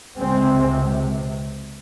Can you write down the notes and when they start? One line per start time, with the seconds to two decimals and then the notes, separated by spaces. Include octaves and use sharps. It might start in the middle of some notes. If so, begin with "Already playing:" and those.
0.18 C#2 C3 G#3 C4